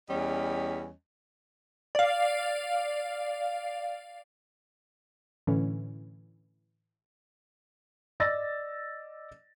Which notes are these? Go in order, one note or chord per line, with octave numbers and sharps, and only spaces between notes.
E2 G3 C#4 D#5
D5 F5
A2 D3 E3 C#4
D5 D#5 E6 A6 A#6